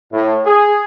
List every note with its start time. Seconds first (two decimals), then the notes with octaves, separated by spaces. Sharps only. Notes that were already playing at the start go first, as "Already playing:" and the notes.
0.12 A2
0.44 G#4